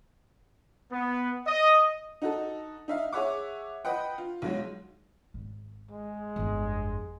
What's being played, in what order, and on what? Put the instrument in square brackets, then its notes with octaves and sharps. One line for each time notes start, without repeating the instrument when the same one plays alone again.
[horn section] B3
D#5
[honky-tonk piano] D#4 F#4 A4
D#4 E5 F5
G#4 C#5 E5 F#5 D6
B4 D#5 F#5 G5
F4
B1 F#3 G#3
[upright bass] G#1
[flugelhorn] G#3
[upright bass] G1 F2